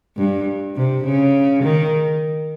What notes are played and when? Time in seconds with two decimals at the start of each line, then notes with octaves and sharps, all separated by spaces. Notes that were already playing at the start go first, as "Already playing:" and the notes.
0.17 G2
0.76 C3
1.04 C#3
1.63 D#3